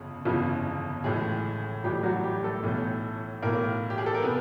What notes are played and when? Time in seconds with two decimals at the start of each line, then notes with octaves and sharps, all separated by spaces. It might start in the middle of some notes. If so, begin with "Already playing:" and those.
Already playing: G1 F2 C#3
0.25 G1 F2 C#3 E3
1.04 A1 A2 E3 G#3 G#4
1.84 A1 A2 E3 G3 G4
2.03 F#3 F#4
2.24 G3 G4
2.43 A3 A4
2.63 B1 A2 E3
3.42 B1 A2 E3 A#3 A#4
3.90 G4
3.98 G#4
4.06 A4
4.14 A#4
4.22 C3 B3 B4